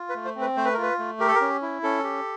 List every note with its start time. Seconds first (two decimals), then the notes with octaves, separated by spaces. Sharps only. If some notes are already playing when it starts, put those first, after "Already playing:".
Already playing: F4
0.09 B4
0.15 A3
0.25 C5
0.35 C4
0.41 B4
0.56 A3 C5
0.65 B4
0.74 A#4
0.78 F4 B4
0.99 A3
1.20 G4 A#4
1.28 A4
1.35 A#4
1.41 C#4
1.62 E4
1.83 C#4 A4
2.04 G4